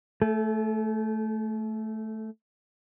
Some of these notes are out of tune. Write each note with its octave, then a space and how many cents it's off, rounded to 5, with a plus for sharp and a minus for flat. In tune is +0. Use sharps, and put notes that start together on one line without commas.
A3 +0 A4 -40